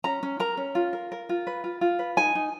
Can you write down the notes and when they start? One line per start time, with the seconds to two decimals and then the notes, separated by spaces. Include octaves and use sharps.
0.04 C#4 A#5
0.23 C#4
0.40 A#4 A#5
0.57 C#4
0.75 F4
0.93 A#4
1.12 A#4
1.29 F4
1.47 B4
1.64 F4
1.81 F4
1.99 B4
2.17 D#4 G#5
2.35 D#4